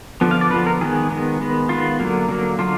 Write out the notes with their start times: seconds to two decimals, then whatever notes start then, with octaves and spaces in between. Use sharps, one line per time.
0.21 D3 F3 B3
0.31 F5
0.41 D5
0.50 D3 B4
0.54 F3 B3
0.66 A#4
0.81 D#3 G#3 B3 G#4
1.10 D#3 G#3 B3
1.41 D#3 G#3 B3
1.69 D#3 G#3 B3 F4
2.00 D3 F#3 A#3
2.29 D3 F#3 A#3
2.59 D3 F#3 F4